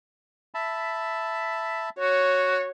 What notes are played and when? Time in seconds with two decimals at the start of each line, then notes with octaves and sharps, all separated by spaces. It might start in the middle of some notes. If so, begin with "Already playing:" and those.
0.54 E5 A5 B5
1.99 F#4 C#5